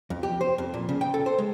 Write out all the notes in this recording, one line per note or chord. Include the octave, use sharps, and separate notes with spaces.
F2
G4
C5
F2
A#2
C#3
G5
A4
C5
G#3